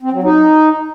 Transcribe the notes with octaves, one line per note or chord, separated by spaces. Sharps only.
C4
F#3
D#4